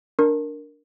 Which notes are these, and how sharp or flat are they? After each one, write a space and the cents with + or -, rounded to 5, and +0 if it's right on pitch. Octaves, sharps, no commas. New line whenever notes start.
D4 +0 A#4 +0 C#6 -45